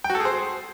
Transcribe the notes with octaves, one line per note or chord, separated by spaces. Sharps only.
G5
F#4
A4
G#4
C5